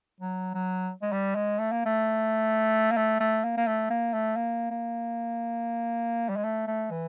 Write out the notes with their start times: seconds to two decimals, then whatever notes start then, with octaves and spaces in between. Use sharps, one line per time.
0.21 F#3
0.54 F#3
1.02 G#3
1.12 G3
1.35 G#3
1.59 A3
1.72 A#3
1.86 A3
2.91 A#3
2.97 A3
3.20 A3
3.44 A#3
3.57 A#3
3.67 A3
3.90 A#3
4.13 A3
4.36 A#3
4.71 A#3
6.29 G3
6.36 G#3
6.44 A3
6.67 A3
6.91 E3